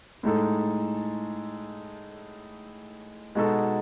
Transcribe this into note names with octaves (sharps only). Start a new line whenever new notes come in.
A2 G#3 D#4 A4
B2 G#3 D#4 F#4 A4